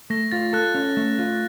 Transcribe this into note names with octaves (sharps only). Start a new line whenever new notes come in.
A3 A#6
F4 A6
A4 F#6
C#4
A3
F4